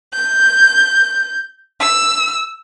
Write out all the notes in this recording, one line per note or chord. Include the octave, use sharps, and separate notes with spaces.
G6
E6